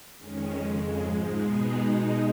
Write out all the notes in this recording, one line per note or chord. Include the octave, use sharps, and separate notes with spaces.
F2 D#3 G#3 C#4
F2 C#3 G#3
G#2 F3 G#3
B2 G#3 B3 D#4 G#4
B2 G#3 D#4